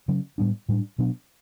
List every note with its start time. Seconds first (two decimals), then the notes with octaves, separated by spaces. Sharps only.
0.08 C#3 F#3 C#4
0.38 A2 G3 B3 D4
0.69 A2 G3 B3 D4
0.98 B2 F#3 B3 D4